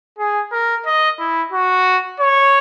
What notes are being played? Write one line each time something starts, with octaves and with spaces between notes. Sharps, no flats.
G#4
A#4
D#5
E4
F#4
C#5